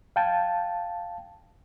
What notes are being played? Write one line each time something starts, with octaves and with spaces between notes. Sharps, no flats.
F5 G5 A5